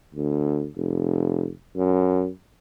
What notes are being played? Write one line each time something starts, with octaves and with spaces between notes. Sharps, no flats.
D2
F1
F#2